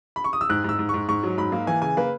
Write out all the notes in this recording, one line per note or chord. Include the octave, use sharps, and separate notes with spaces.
B5
C#6
D#6
E6
G#2 F#6
G#2 E6
G#2
G#2 C#6
G#2 C#6
F#3
G#2 B5
A#3
E3 G#5
C#3 G#5
A#3 B4